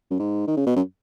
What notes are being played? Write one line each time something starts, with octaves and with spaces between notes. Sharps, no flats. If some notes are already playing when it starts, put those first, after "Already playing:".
F#2
G#2
D#3
C#3
B2
F#2